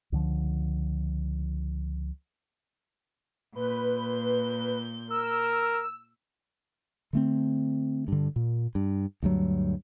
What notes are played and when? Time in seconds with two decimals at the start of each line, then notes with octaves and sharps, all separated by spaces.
0.12 C#2 D3 F3
3.55 A#2 B4 G6
5.10 A#4 E6
7.13 D3 A3 C4
8.08 G2 D3
8.36 A#2
8.75 G2
9.23 D2 G2 F#3